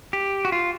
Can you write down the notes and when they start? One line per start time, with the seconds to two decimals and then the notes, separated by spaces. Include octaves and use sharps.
0.13 G4
0.45 F#4
0.52 F4